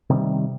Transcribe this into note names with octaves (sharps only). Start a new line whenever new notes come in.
C3 D#3 G3